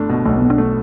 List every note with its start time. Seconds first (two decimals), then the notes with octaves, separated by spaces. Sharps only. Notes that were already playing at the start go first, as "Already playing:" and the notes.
Already playing: G1 A3 D4
0.09 B2
0.25 B1 A3
0.37 B1 B3
0.50 D4
0.58 A3